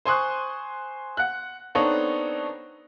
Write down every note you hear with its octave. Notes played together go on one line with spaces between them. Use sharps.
C5 G#5 C6 C#6 D#6 F#6
F#5 F#6
B3 C4 D4 D#4 A4 C#5